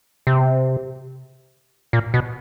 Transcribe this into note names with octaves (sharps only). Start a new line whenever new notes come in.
C3
A#2
B2